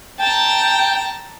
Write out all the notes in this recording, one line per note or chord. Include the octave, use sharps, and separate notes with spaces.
G5 A5 A#5